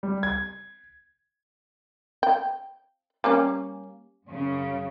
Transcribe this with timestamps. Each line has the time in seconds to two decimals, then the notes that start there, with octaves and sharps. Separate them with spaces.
0.03 G3
0.23 G#6
2.23 G5
3.24 G3 A#3 C#4
4.29 F#2 C#3